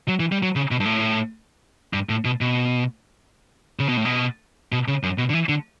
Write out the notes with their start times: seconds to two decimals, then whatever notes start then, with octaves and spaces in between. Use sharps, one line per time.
0.08 F#3
0.20 E3
0.32 G3
0.43 F#3
0.56 C#3
0.71 B2
0.80 G2
0.85 A2
1.93 G2
2.09 A2
2.25 B2
2.41 B2
3.79 C#3
3.88 B2
3.97 A2
4.05 B2
4.72 B2
4.88 C#3
5.03 F#2
5.18 B2
5.30 D3
5.33 E3
5.49 D3